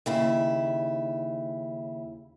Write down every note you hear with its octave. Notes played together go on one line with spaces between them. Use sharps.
D#2 C#3 E4